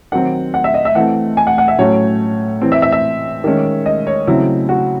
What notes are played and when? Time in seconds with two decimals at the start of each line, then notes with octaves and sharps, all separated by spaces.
0.12 D#3 F#3 C4 F#5
0.54 F#5
0.64 E5
0.74 D#5
0.85 E5
0.95 E3 A3 C4 F#5
1.37 G#5
1.47 F#5
1.58 F#5
1.68 E5
1.79 A2 F#3 A3 C#4 C#5
2.62 E3 C4
2.72 E5
2.82 E5
2.92 E5
3.44 D#3 G#3 C#4
3.86 D#5
4.07 C#5
4.27 C#3 F#3 A3 C4 E4
4.69 F#4